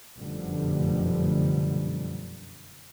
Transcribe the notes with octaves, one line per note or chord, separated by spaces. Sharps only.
F1 F#2 B2 D3 F3 G3